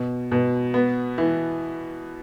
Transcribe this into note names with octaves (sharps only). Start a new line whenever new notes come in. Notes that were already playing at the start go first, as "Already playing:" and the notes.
Already playing: B2
B2
B3
E3